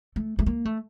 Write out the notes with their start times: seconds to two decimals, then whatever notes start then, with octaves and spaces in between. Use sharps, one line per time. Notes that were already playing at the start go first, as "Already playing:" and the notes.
0.16 A3
0.39 A3
0.46 A#3
0.65 A3